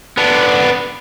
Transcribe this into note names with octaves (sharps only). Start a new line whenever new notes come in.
B3 D4